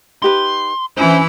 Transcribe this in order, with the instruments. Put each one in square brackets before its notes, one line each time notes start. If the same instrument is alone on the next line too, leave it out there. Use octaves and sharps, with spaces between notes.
[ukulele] D#4 G4 B4 [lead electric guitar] C6
[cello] E3 E4 [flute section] C#4 G#5 [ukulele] D4 [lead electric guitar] C5